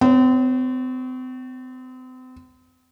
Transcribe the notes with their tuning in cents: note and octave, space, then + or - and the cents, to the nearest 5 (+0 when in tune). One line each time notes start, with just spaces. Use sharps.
C4 -40 C#5 +0